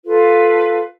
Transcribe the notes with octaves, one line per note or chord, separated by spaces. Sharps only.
F4 A4 B4 F5